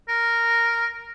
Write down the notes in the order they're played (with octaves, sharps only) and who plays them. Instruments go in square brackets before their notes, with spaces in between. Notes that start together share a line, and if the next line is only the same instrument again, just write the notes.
[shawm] A#4